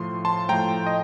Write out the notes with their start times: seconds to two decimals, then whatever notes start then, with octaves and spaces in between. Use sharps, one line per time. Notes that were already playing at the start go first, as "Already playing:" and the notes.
Already playing: A2 F3 A3 C6
0.25 A5 C6
0.49 A2 F3 A3 G5 A#5
0.87 D#5